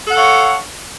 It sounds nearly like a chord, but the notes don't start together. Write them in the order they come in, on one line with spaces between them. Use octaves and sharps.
A4 F#5 C#5 F5